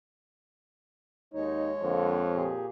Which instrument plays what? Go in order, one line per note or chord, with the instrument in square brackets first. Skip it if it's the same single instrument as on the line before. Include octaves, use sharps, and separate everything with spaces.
[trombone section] D#2 D#4 [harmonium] G#3 C#5
[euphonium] F2 [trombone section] D3 A#3 C4
[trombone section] A#2 G4 G#4